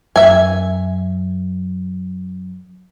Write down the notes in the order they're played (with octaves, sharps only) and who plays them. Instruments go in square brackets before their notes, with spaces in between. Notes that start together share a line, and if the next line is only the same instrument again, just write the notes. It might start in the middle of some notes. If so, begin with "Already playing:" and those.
[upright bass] F#2 [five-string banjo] E5 G#5